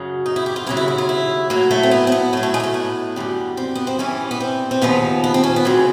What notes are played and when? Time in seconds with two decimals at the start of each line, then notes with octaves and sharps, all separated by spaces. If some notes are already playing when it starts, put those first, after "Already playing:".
Already playing: F#2 C#3 F#3
0.26 D#4
0.36 E4
0.46 G4
0.56 F4
0.67 D#2 C#3 F#3 E4
0.77 E4
0.88 E4
0.98 F4
1.09 E4
1.50 A2 F#3 A#3
1.71 A3
1.83 C4
1.91 B3
2.07 C4
2.12 B3
2.33 A2 A3
2.37 F#3
2.43 A3
2.54 G#3
2.60 A#3
2.63 A3
2.74 B3
3.16 F#2 D3 G3
3.57 C4
3.75 B3
3.87 C4
3.99 G2 E3 G3 C#4
4.31 B3
4.40 C4
4.71 C4
4.82 D#2 C#3 F3 B3
5.24 B3
5.34 C4
5.43 C#4
5.56 B3
5.65 D2 C#3 F#3 C4